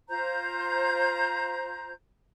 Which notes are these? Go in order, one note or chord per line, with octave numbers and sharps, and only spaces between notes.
F4 C5 A#5 G6